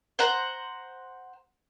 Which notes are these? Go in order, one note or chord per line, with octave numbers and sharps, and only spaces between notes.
C5 F#5 A#5